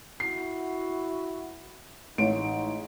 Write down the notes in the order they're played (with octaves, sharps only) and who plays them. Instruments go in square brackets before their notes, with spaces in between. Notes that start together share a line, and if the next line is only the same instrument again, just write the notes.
[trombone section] E4 F#4 [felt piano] C7
[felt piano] A1 C#5 D7 [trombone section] G#3 D#4